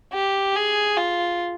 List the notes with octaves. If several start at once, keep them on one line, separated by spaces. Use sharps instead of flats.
G4
G#4
F4